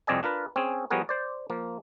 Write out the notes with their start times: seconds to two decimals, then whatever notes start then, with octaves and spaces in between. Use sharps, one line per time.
0.07 C2 F2 C4 D5 D#5 G#5
0.23 D4 F4 A#4 B4
0.56 C4 C#4 G#4
0.90 F3 G3 B3 F#4 G#4 A#4
1.09 C5 D5
1.50 F3 A#3